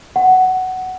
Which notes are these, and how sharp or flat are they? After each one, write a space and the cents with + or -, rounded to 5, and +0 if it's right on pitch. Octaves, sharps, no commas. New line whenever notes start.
F#5 +10